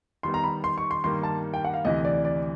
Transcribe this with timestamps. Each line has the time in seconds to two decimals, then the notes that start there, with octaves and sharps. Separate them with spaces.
0.23 D#3 G3 B3 C6
0.34 A#5
0.44 B5
0.64 C6
0.78 C#6
0.91 C6
1.04 G2 D#3 G3 A#3 C6
1.23 A5
1.54 G5
1.65 F#5
1.74 F5
1.85 D2 C3 E3 D#5
2.05 D5
2.25 D5